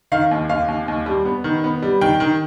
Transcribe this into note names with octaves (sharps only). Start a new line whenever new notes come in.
D#3 F5
D#2
D#2 F5
D#2
D#2
G3
B3
D#3
B3
G3
D#3 G5
D#3